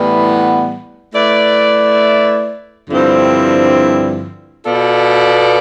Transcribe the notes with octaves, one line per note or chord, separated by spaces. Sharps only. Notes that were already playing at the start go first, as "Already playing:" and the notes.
Already playing: A2 E3 G3 B3
A3 E4 B4 D5
G2 D3 F3 C4 E4
B2 B3 F4 A4 D5